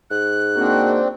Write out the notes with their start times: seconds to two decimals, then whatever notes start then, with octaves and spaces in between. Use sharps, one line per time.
0.11 G#2 F#6
0.56 A#3 C4 D4 F#4